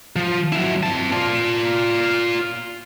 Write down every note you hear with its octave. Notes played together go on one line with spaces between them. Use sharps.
F3
F#3 E4
C4 A5
F4 D5